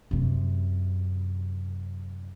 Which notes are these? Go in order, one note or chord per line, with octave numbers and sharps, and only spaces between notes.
F#2 C3